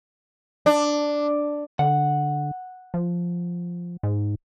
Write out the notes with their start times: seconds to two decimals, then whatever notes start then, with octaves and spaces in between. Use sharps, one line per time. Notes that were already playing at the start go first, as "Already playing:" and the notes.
0.66 D4
1.79 D3 F#5
2.94 F3
4.03 G#2